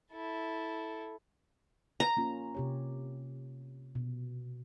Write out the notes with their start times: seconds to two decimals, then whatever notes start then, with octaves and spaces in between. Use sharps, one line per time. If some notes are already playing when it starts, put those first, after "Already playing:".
0.12 E4 A4
2.00 A#5
2.17 A#3 C#4 F4
2.55 C3 G4 C#5
3.95 B2